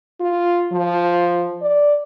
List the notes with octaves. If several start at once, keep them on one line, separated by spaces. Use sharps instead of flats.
F4
F3
D5